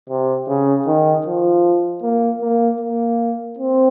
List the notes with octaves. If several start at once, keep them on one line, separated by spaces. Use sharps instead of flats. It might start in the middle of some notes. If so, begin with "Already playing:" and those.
C3
C#3
D#3
F3
A#3
A#3
A#3
C4